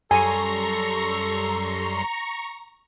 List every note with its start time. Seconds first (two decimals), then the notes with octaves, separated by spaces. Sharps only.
0.11 F#2 G3 A4 G#5 A#5 C6 C#6